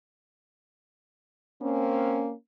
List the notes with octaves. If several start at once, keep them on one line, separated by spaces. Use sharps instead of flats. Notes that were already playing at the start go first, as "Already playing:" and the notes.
A#3 C4 C#4